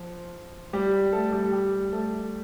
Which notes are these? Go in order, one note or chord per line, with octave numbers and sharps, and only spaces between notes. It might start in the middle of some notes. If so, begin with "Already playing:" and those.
Already playing: F3 F4
G3 G4
A3 A4
G3 G4
G3 G4
A3 A4